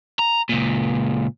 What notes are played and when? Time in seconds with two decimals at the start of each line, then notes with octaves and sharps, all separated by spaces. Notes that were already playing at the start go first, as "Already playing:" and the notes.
0.19 A#5
0.49 C#2 A#2